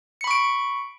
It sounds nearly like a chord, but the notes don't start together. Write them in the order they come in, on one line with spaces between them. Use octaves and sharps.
C#7 B5 C#6 D7